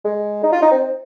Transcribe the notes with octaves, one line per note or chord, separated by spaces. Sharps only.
G#3
D#4
F4
D#4
C4